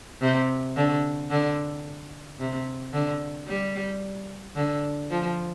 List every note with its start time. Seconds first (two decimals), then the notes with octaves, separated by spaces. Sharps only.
0.22 C3
0.76 D3
1.31 D3
2.39 C3
2.93 D3
3.48 G3
4.56 D3
5.10 F3